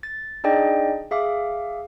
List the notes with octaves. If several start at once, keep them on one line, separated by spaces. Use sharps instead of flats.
A6
D4 D#4 G#4 D5 D#5 G5
G#4 E5 F5 D6